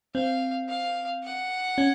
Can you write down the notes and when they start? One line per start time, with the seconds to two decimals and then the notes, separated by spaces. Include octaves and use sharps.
0.15 C4 F5
0.68 F5
1.24 F#5
1.78 C#4